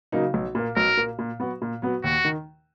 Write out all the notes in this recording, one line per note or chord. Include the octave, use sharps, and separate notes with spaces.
C#3 F#3 A#3 D#4
B1
A#2 A#3
B1 A#4
A#2 A#3
A#2
F#3 B3 F#4
A#2
F#3 B3 F#4
D#2 F#4
D#3